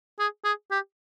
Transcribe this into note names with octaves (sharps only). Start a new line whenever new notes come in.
G#4
G#4
G4